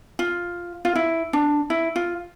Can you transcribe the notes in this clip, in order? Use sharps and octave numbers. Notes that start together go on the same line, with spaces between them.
F4
F4
E4
D4
E4
F4